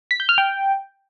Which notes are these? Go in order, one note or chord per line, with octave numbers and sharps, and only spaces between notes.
B6
G6
F6
G5